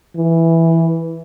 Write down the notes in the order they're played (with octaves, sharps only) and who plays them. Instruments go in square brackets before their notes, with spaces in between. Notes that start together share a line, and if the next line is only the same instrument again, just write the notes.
[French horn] E3